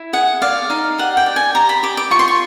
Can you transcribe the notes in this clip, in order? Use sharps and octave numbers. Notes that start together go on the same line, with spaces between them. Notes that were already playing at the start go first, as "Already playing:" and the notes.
Already playing: E4
G#4 F#5
D5 F5
D#4 F5
G4 F#5
G5
D5
G#5
G4 A#5
B5
G4 D6
D6
F4 C#6
C6
C#6